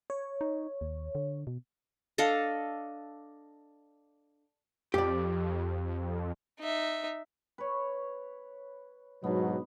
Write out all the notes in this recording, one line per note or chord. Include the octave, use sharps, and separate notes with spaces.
C#5
D#4
D#2
D3
B2
D4 A4 D#5 F5
F2 G4 D5
D#4 E5
B4 C#5
G#2 B2 F#3 B3 D4 D#4